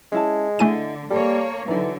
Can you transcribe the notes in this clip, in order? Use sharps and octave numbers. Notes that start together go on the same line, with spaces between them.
G#3 C#4 E4 A5
D3 A3 E4 D#5 G#5 D#7
G3 A#3 A4 C#5
D3 E3 F#3 D#4 D5